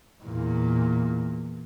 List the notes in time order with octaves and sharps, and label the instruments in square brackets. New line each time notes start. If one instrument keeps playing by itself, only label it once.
[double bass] E2 A#2